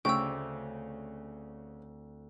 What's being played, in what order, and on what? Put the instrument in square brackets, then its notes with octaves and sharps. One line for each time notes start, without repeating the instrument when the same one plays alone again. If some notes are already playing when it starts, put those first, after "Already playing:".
[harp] D2 C4 D5 [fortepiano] C#3 [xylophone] G5 E6 [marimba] C#6